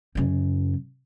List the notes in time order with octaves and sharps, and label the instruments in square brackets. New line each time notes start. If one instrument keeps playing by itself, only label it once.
[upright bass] F#2 C#3